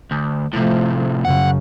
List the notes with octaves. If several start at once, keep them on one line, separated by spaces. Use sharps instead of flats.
D2
A2 C3 F3 A3
F#2 C#3 F#5